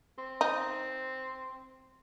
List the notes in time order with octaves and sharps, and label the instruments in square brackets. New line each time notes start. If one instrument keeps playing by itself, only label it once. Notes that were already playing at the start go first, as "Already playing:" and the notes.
[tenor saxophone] C4
[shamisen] D#4